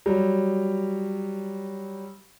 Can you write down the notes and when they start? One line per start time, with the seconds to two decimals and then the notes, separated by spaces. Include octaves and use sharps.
0.06 F#3 G3